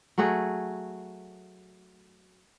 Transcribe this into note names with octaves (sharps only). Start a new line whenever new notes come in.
F#3 A3 F#4 G#4